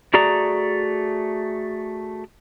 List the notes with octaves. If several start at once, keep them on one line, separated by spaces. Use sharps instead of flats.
A3 F#4 G#4 D5 A#5